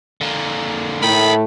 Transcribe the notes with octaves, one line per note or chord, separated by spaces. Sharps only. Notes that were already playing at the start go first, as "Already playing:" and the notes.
D3 A#3
A2 A3 A#4 G5 B5